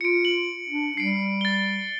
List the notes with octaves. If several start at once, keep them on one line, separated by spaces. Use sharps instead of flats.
F4 C#7 D7
F#7
D4
G3 C7 D7
A6 G7